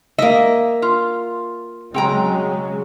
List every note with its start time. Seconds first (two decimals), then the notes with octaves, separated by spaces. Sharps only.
0.18 A#3 D#5 E5
0.82 F4
1.94 C#3 F#3 G#3 C4 G5 A#5